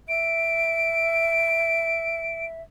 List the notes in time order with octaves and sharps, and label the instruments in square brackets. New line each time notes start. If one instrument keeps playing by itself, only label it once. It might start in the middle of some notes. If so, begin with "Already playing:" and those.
[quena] E5 [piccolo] D7